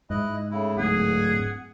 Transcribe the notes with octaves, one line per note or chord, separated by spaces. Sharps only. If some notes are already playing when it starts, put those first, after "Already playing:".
G#2 E4 D#5 F#6
A2 C#3 E4
D1 G#4 F#5